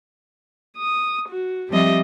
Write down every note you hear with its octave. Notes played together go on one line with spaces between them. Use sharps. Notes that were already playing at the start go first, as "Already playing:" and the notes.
D#6
F#4
F3 G3 C4 G4 D#5 E5